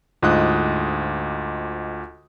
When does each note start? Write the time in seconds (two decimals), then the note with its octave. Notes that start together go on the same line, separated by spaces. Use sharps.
0.23 D2 G#2 F4 D#5 D#6 F#6